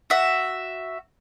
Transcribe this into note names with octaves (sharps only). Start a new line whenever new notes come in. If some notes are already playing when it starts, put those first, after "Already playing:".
F#4 E5